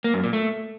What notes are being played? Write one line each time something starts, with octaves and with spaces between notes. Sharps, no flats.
A#3
F#2
A#2
A3